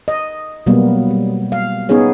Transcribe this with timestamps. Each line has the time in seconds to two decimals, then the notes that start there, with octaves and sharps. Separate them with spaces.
0.08 D#5
0.66 B2 F#3 G3 A#3 B3
1.10 G3
1.52 F5
1.89 B3 C#4 D#4 G#4 C#5